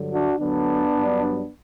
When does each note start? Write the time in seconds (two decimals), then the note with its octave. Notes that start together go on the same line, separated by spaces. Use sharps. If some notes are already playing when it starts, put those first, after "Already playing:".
Already playing: G2 D3 F#3
0.12 D4 F#4
0.40 D2 D3 F#3 B3 D4
0.97 G2 F#3